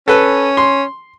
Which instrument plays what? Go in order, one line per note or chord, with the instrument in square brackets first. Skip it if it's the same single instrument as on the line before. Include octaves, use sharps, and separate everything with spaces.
[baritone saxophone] C#4 [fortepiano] A4 B4
[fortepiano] C6